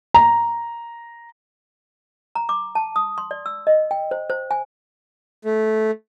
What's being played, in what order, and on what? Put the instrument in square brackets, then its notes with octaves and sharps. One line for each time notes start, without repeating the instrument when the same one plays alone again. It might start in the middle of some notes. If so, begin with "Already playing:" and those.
[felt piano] A#5
[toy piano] A#5
D6
A5
D#6
C6
D5
E6
D#5
G5
C5
C5
G#5
[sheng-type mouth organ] A3